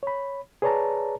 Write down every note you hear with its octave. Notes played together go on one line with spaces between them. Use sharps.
C#5 B5
G#4 B4 C#5 D5 A5 A#5